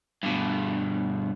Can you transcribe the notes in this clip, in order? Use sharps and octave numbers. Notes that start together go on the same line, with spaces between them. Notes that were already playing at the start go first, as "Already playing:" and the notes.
G2 B2